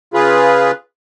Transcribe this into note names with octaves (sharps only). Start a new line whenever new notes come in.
C#3 F4 G#4 B4